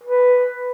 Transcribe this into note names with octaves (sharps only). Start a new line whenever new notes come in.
B4